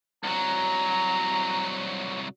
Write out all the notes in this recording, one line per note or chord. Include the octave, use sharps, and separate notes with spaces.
C2 F#3 A#5